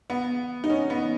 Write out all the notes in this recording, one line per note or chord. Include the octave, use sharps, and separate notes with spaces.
B3
D#4
C#4
B3